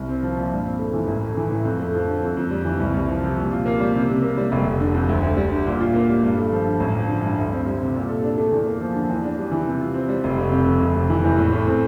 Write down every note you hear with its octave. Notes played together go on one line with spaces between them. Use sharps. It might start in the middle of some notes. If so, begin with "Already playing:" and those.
Already playing: C2
C4
F3
A#2
G2
C4
A3
E3
A1
A3
E3
A2
F2
A3
F3
D3
F2
F2
G3
E3
C2
C2
F3
C3
A#2
F4
A#3
G3
C3
C3
A#3
G3
F1
F1
D3
F2
D2
D2
G3
D3
A#2
F4
A#3
G3
G2
A3
F3
D3
A1
F3
D3
G2
D2
C4
G3
C3
A#2
A4
D4
A3
E2
A#3
F3
D3
E2
D4
G3
E3
C3
F4
C4
G3
F1
F1
C3
F2
F1
F1
E3
E2
A2
A2
C4